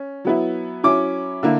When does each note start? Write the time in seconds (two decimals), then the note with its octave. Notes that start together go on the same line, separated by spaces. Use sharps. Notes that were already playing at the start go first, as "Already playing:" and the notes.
Already playing: C#4
0.25 F#3 B3 E4
0.84 F#3 C#4 E4 D6
1.43 D3 A#3 E4